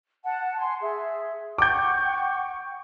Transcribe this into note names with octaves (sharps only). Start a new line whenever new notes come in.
F#5 A5
G#5 C6
G#4 E5
F#5 G5 C#6 D6 G6